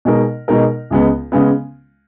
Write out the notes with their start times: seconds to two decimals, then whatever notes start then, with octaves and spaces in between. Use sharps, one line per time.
0.05 B2 G#3 D#4 A#4
0.48 B2 G#3 D#4 A#4
0.90 C#2 C#3 G#3 B3
1.32 C#3 G#3 B3